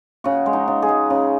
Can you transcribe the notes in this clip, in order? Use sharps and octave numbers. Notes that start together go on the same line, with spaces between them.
C#3 F#4
G#3
D#4
C#3
G#4
G#3
C#3